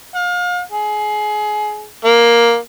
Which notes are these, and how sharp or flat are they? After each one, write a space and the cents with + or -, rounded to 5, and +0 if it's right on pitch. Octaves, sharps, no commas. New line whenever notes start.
F5 +35
G#4 +25
A#3 +10